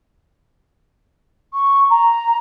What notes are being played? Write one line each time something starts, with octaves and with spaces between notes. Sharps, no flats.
C#6
A#5